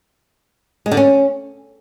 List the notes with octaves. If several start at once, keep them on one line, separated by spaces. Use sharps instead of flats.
G#3
D3
C#4